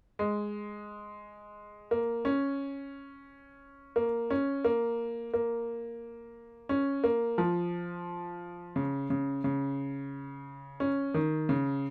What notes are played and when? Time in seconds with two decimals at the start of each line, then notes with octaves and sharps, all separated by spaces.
0.19 G#3
1.91 A#3
2.25 C#4
3.96 A#3
4.30 C#4
4.64 A#3
5.33 A#3
6.69 C#4
7.04 A#3
7.38 F3
8.76 C#3
9.10 C#3
9.44 C#3
10.80 C#4
11.14 D#3
11.49 C#3